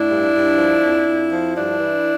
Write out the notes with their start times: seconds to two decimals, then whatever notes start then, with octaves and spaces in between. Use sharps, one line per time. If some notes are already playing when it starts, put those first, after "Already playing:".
Already playing: A2 D4 E4
0.10 G2
0.34 G2
0.58 F3
0.82 F2
1.06 F2
1.32 F3
1.55 G2 D4 E4
1.80 E3